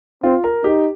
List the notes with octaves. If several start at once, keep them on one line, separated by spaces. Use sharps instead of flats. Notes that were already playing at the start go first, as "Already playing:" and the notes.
C4 F4
A#4
D#4 G4